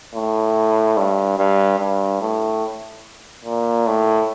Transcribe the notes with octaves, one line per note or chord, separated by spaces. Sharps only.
A2
G2
G2
G2
A2
A#2
A2